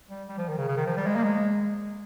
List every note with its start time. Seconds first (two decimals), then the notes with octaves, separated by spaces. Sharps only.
0.10 G3
0.29 G3
0.38 F3
0.48 D#3
0.58 C#3
0.68 C#3
0.77 D#3
0.87 F3
0.97 G3
1.06 G#3
1.16 A#3
1.24 G#3